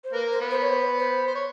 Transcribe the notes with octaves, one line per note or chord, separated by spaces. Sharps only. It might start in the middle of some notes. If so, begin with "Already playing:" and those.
C5
A#3 A#4 B4
C5
B3 B4
C5
C#5
C5
C5
C5
C#5